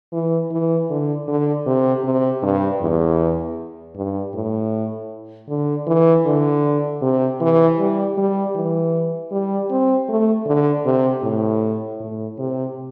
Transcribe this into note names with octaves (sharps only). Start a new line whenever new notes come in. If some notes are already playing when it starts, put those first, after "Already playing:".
E3
E3
D3
D3
C3
C3
G2
E2
G2
A2
D3
E3
D3
C3
E3
G3
G3
E3
G3
C4
A3
D3
C3
A2
A2
C3